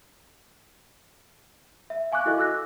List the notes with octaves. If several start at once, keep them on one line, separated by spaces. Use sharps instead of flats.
E5
F5 G#5 C#6 D6 F#6
E4 F#4 A4 D#5 F5
D6 E6 F#6 A#6